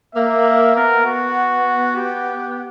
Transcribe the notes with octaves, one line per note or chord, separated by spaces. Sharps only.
A#3 E5
B3 A#4
F#4
G4